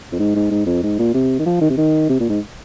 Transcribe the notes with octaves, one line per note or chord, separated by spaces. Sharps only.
F2
G#2
G#2
G#2
F2
G#2
A#2
C3
D#3
F3
D#3
C3
D#3
C3
A#2
G#2